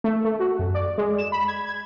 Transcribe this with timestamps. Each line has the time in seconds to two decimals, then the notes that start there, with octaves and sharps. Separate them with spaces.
0.04 A3
0.25 A3
0.40 F#4
0.59 F#2
0.75 D5
0.98 G#3
1.19 E7
1.32 B5
1.48 G#6
1.66 G#6